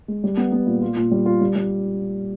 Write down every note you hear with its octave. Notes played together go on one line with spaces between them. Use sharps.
G#3
G3
B3
B3
A#2
F4
A#2
G3
F4
G3
G3